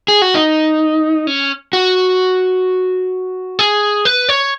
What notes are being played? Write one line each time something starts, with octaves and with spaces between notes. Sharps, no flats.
G#4
F#4
D#4
C#4
F#4
G#4
B4
C#5